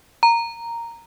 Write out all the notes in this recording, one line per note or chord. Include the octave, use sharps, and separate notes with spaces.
A#5